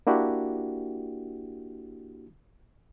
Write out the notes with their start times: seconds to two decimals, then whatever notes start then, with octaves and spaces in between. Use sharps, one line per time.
0.07 A#3 D4 E4 F#4 G4